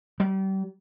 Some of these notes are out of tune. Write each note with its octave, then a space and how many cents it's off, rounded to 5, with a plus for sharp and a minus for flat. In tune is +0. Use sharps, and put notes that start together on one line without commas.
G3 -35